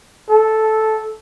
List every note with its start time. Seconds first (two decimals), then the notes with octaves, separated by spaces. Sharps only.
0.29 A4